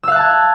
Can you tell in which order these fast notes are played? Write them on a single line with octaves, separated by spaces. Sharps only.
E6 F5 F#6 A5 G#6